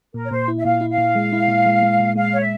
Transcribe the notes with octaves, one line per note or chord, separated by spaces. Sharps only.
A#2 A#4
C#5
A#2 C5
E4
E5
A#2 F5
E4
F5
A#2
G#3
E4
A#2
G#3
G#3
A#2
G#3 F5
C#5
E5